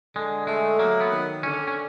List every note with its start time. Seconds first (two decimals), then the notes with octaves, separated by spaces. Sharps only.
0.15 D3 G#3
0.47 G#3 A3
0.79 F#3 A#3
1.01 B3
1.11 D#3
1.43 D3 C#4
1.68 C#4